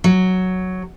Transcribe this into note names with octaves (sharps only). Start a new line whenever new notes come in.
F#3